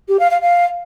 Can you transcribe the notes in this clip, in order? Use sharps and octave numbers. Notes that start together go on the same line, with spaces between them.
G4
F5
F5
F5